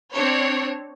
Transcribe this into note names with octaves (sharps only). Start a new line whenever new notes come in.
C4 D4 C#5